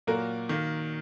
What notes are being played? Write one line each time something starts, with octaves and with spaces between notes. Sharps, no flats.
A#2 F#3 A#3 F#4 A#4
D#3 A#3